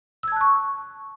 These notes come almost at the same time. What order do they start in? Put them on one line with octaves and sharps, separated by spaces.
E6 G#6 A5 F#6 C#6